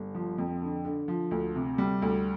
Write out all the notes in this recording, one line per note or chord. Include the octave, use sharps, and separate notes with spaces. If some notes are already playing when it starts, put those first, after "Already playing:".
Already playing: G1
F3
F2
D3
D3
F3
D2
C3
G3
D2